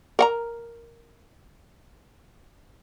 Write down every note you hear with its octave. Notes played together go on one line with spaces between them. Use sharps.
A#4 F#5 A#5